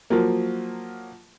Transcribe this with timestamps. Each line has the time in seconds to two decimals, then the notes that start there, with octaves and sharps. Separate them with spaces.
0.10 F3 F#3 A#3